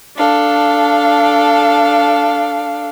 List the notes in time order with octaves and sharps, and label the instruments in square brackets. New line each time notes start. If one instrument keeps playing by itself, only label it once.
[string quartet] D4 A4 F5